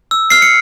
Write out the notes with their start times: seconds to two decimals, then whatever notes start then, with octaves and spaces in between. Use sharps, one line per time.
0.11 E6
0.30 F6 C7
0.42 C#7